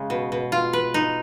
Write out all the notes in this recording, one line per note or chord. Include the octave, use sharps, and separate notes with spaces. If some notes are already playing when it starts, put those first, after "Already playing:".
Already playing: C#3 G#3
B2
B2
F4
B4
D#4